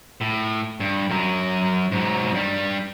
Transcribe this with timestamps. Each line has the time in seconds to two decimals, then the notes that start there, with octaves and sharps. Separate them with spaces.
0.21 A2
0.80 G2
1.10 F#2 F#3
1.92 G#2 F#3
2.34 G2 G3